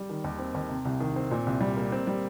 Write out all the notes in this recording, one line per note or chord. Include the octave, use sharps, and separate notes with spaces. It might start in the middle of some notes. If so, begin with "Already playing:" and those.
Already playing: G3
D#3
D#2
C4
D#2
C3
C2
D#3
C4
A#2
C2
G3
A#3
C4
G3